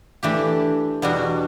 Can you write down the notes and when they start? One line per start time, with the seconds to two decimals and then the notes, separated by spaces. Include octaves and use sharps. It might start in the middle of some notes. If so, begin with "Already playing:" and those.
0.23 E3 A3 D4 G4
1.02 E2 B2 G3 D4 F#4